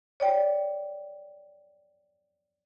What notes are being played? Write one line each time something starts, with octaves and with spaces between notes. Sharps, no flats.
C#5 D5 G5